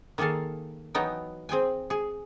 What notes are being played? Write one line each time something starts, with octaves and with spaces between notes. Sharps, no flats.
D#3 A#3 G#4 A4 F5
E3 F#3 B3 D#4 G5
C4 G#4 G5 G#5
G#4